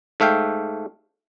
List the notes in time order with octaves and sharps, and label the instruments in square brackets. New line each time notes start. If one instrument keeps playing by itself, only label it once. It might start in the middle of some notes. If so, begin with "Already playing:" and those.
[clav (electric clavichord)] G#2 A3 E5 F5 G5